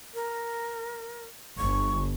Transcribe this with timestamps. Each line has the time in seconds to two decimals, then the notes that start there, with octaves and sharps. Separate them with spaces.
0.14 A#4
1.58 G1 C#6